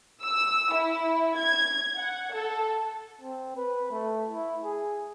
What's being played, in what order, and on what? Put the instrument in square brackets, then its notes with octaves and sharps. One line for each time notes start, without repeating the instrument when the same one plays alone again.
[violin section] E6
E4
G#6
F#5
A4
[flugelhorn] C4
B4
A3
E4
G#4